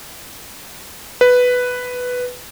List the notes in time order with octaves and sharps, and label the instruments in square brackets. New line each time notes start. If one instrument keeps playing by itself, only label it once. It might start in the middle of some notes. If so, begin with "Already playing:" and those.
[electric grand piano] B4